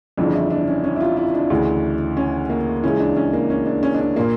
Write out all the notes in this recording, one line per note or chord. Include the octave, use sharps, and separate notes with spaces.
G1 F2 C#3 E3 D4
E4
D4
C#4
C#4
E4
F4
E4
D4
D2 C#3 E3
C#4
A#3
C#2 C#3 E3 C#4
D4
C#4
A#3
C#4
D4
C#4
D4
C#4
A#2 A#3